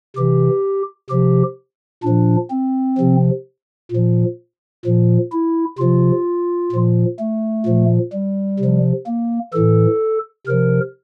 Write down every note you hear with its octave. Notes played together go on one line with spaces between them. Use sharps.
C3 E3 G4
C3 F3 G4
A#2 F3 D4
C4
C3 F3
A#2 F3
A#2 F3
E4
C3 F3 F4
A#2 F3
A3
A#2 F3
G3
C3 F3
A#3
A2 E3 A4
C3 F3 A#4